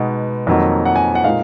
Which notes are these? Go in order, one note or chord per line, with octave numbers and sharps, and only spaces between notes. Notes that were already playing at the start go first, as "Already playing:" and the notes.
Already playing: B2 G#3 B3 D#4
F2 D#3 F#3 A#3 D#4
F#5
G#5
F#5
A#2 G#3 D#4 F5